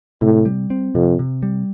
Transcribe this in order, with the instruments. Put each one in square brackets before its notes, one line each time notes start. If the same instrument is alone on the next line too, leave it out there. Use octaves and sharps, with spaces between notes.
[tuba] A2 [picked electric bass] C3
[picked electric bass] G3
C4
[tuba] F2 [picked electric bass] C3
[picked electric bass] C3
G3